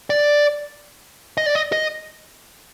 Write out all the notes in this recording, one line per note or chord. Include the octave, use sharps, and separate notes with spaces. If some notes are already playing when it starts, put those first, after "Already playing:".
D5
D#5
D5
D#5
D#5